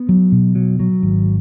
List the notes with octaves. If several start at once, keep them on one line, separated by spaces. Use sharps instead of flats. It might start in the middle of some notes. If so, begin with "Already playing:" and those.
Already playing: B3
F#3
B2
F#3
F#3
G#1